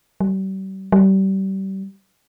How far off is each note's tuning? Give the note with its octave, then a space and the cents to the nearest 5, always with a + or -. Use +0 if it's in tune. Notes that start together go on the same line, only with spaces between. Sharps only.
G3 -40
G3 -30